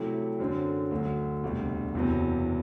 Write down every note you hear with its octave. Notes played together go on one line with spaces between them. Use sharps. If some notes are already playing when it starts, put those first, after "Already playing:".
Already playing: C3 F#3 A3 E4 G4
F#2 D3 F#3 C4
D2 D3 F#3
E1 D2 C3 G3
F#1 E2 C3 F#3 B3